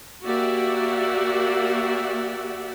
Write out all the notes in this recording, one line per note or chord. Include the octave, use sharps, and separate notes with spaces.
A#3 F#4 G4 D5 E5 F#5